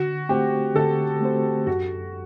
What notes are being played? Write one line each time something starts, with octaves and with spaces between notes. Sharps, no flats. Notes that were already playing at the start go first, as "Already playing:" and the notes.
Already playing: D3 F#4
A3 C4 F#4 G4 C5
D3 A4
A3 C4 F#4 C5
F#2 F#4